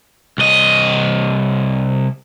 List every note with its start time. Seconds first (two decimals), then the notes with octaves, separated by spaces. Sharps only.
0.38 C2 D#5